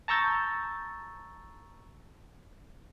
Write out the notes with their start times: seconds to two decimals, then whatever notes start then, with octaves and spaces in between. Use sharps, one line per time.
0.08 A5 A#5 C#6 E6 G6 A6